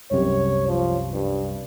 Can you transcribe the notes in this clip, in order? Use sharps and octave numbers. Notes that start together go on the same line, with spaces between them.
C2 F#2 C3 C#5
F3
G2